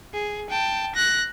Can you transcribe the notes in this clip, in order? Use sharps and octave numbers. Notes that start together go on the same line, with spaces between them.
G#4
G5 A5
F#6 A#6